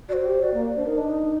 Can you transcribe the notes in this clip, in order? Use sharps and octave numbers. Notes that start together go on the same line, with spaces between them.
F#4 D5
C5
F#4
G4
F#4 D5
A#3
D4 C5
D#4 A#4
D4 D#5
D#4